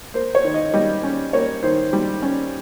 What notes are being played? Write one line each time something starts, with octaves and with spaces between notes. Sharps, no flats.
A#3 C5
C#5
D#3
D#5
G3 D#5
C#4
A#3 C#5
D#3 C5
G3
C#4